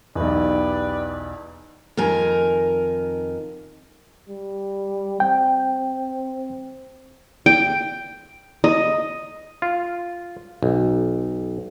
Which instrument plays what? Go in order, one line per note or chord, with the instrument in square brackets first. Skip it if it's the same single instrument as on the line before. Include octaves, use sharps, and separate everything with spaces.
[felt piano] B1 E2 [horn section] G4 B4 D5
[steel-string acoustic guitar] F2 D#3 A#4 G#5
[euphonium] G3
[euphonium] C4 [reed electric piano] G5
[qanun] G5
D#5
[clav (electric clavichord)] F4
B1